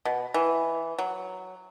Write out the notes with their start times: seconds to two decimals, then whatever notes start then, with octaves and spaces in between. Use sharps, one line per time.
0.05 B2
0.34 E3
0.99 F#3